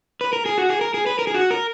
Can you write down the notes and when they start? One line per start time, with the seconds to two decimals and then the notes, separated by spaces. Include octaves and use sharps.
0.21 B4
0.33 A#4
0.46 G#4
0.58 F#4
0.69 G#4
0.81 A#4
0.94 G#4
1.06 B4
1.19 A#4
1.27 G#4
1.35 F#4
1.51 A#4